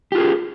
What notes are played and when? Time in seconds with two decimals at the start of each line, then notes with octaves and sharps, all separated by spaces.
0.12 G4
0.15 F4
0.18 G#4